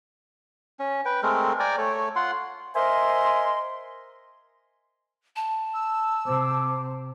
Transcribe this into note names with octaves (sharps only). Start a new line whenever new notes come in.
C#4
B4 G5
G#3 A3 C4 A#4
D5 G5 G#5 A#5
A3 C#5
F4 F#5 C6
A#4 C5 D#5 E5 G#5 C6
A5
E6
C3 C5 D6